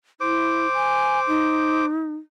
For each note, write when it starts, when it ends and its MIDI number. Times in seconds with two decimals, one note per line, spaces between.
0.21 0.71 64
0.21 1.86 72
0.21 1.86 86
0.73 1.20 80
1.28 2.15 63